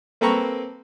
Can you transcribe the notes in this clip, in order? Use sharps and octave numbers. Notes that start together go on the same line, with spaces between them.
A#3 C4 A4 B4 A#5 C#6